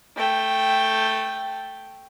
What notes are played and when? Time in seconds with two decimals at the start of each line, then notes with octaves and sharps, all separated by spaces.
0.17 A3 G5